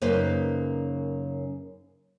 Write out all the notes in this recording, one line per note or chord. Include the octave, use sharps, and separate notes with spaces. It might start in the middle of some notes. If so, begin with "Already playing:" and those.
F#2 C#3 A#3 D#4 B4 C5